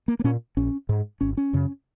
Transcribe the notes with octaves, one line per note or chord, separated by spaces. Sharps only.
A#3
A#3
A#2 C#4
A#1 C#4
G#2
G#1 C#4
C#4
F#2 C#3